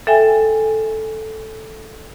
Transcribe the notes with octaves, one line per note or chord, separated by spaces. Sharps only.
A4 E5 G5 G#5